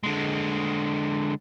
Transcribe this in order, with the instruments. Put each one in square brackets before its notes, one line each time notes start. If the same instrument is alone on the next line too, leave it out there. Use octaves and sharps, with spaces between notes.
[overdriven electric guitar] D3 G#3